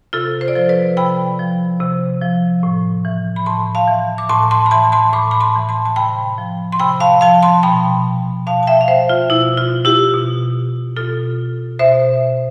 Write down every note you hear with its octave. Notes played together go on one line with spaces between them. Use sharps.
C3 F4 A4
C5
D5
F3 A4 C5
B4 D5
C3 G5 B5
F3
C3
F3
A2
E3
B5
A2 A5 C6
F5 A5
E3
D6
A2 A5 C6
A5 C6
B5
E3 A5 C6
A5 C6
A2 B5 D6
B5
A5 C6
E3
A5 C6
A5
C3 G5 B5
F3
C6
C3 G5 B5
F5 A5
F3 F5 A5
A5 C6
B2 G5 B5
B2 F5 A5
A5
E5 G5
F5
C5 E5
F4
B2 E4
F4
E4 G4
B2
B2 F4 A4
B2 C5 E5